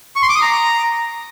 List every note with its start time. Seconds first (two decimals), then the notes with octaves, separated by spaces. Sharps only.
0.16 C#6
0.22 C6
0.29 D6
0.35 D#6
0.42 A#5